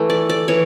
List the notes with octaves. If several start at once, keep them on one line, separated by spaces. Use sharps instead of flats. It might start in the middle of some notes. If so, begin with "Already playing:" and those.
Already playing: E3 A3
D5
D5
E3 C#5